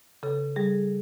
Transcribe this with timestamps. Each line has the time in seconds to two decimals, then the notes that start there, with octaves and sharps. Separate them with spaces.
0.23 C#3 A4
0.56 G3 G#4